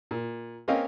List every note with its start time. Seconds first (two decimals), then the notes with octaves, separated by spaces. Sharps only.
0.11 A#2
0.68 A#3 C4 C#4 D#5 F5